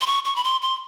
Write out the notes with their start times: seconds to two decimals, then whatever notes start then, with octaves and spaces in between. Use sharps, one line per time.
0.01 C6
0.06 C#6
0.25 C#6
0.36 B5
0.44 C6
0.62 C6